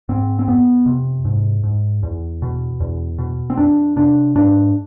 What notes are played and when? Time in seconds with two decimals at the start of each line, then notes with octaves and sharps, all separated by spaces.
0.09 G#2 C4
0.39 C4
0.48 F2 B3
0.86 C3
1.25 G#2
1.63 G#2
2.03 E2
2.42 B2
2.80 E2
3.18 B2
3.50 C4
3.57 F2 D4
3.96 C3 D4
4.35 G#2 D4